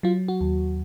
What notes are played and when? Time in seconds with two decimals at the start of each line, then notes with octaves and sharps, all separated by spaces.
0.03 F#3 F4
0.28 F#4
0.41 D#2